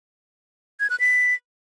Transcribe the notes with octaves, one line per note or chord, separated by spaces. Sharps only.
G#6
F#6
B6